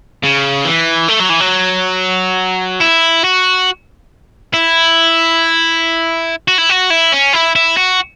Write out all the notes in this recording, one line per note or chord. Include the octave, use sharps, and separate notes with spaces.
C#3
E3
A3
F#3
E3
F#3
E4
F#4
E4
F#4
E4
F#4
E4
C#4
E4
E4
F#4